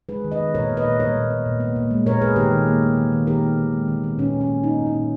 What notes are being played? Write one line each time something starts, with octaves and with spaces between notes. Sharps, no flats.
G#3 G#4 B4
D#3
B4 D#5
B3
A#2 A#4 C#5
B3
B4 D#5
A#2
G3 A#4 C#5
A#2
B3
A#2
B3
A#2
G#3
A#2 A#4 C#5
B3 G#4 B4
D#3 G4 A#4
D#3
A#3
A#3
D#3
D#3
D#3 G4 A#4
B3
D#3
G#3
D#3
B3
A#2 C#4
A#2
C#4
A#3
A#3 D#4
A#2
C#4 E4
A#2